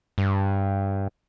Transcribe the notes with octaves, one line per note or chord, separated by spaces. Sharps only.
G2